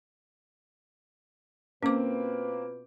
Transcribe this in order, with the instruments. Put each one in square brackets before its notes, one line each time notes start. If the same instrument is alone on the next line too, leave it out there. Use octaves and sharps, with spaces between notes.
[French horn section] B2 F4 B4 [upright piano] A#3 C4 [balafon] C#4 D6